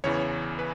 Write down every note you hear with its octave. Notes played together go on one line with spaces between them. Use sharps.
E2 C#3 E3 C#5
B4